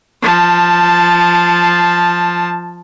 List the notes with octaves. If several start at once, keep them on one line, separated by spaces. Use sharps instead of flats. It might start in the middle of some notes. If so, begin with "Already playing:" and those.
F3 A5